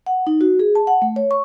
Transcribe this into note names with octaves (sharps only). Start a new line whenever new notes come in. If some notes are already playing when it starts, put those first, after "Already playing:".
F#5
D#4
F#4
G#4
A5
F#5
A3
C#5
C#6